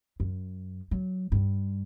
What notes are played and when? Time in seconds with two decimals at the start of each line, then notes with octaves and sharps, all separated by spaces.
0.20 F#2
0.91 F#3
1.32 G2